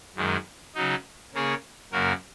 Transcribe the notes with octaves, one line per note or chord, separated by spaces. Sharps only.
F#2 D#3 G#3
C#3 F#3 D#4
C#3 A#3 C#4 G#4 C#5
F#2 C#3 A#3 F#4 A#4